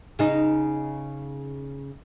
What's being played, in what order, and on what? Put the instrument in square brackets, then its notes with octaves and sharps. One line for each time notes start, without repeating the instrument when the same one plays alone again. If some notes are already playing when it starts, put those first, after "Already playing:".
[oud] C#3 D#4